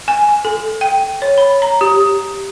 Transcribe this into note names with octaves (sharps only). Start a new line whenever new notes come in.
G#5
A4
G5
C#5
B5
A#5
G4